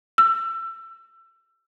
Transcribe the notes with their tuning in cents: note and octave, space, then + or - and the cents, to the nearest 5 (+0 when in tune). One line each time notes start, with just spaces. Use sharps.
E6 +25